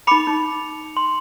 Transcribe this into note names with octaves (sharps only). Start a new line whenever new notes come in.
D#4 B5 D6 C#7 F7
D#4
C6